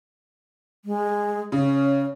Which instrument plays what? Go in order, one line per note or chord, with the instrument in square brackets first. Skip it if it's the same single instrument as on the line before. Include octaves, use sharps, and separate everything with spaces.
[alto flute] G#3
[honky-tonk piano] C#3 [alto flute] C#4